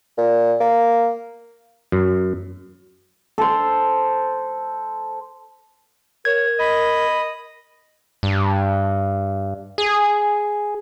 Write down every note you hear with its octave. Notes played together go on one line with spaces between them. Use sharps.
A#2
A#3
F#2
A4 C5
A#4 C#5 G#6
D#5 B5
G2
G#4